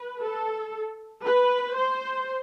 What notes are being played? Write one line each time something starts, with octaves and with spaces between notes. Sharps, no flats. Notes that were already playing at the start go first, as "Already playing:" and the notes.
Already playing: B4
A4
B4
C5